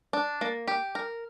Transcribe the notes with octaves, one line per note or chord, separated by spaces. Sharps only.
D4
A#3
G4
A#4